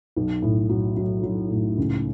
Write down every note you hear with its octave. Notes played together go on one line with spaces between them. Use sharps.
B1
A2
F#3
F#3
F#3
A2
C#2